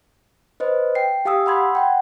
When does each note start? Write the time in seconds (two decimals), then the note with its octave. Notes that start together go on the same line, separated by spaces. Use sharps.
0.60 B4 C5 D#5
0.95 G5 C7
1.25 G4 F5 G#5 D#6 E6
1.46 F#5 B5 C6 G#6
1.75 F#5 G5